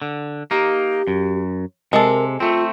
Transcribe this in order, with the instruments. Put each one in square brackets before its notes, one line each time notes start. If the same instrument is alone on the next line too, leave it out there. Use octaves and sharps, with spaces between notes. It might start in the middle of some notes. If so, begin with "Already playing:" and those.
[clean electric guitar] D3
[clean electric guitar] A#3 D#4 [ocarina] G4
[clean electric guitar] F#2
[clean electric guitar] C3 [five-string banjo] G#3 A4 [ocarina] A#4
[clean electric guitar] A3 C4 [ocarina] F4